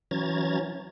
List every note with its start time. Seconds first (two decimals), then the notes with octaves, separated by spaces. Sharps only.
0.11 E3 F#3 C#4 A#5 G#6 A6